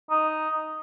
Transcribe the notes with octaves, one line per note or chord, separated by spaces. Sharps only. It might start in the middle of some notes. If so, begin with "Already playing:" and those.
D#4